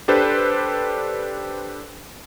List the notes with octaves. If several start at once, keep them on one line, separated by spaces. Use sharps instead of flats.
D4 G4 A4 B4 C5